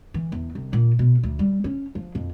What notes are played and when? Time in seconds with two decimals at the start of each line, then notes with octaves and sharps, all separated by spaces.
0.14 E3
0.32 E2
0.55 C2
0.73 A#2
0.99 B2
1.23 D2
1.39 G3
1.64 C#4
1.95 F3
2.15 F2